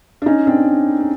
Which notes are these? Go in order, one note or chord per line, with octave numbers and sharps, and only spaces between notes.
D4
C#4 D#4
C4 D4
C#4